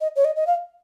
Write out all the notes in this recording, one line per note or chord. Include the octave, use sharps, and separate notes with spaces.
D#5
C#5
D#5
D#5
F5